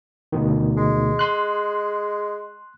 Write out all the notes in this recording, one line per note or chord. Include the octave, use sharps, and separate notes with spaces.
D2 B2 D#3
G#3
C6 F#6